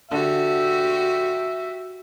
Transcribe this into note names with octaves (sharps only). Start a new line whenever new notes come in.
D3 F#4 G4 E5